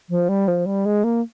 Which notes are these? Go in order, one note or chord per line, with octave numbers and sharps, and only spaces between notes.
F3
G3
F3
G3
G#3
A#3